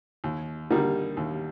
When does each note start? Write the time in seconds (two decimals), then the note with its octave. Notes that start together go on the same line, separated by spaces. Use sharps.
0.24 D#2
0.70 D3 G3 A#3 D#4
1.17 D#2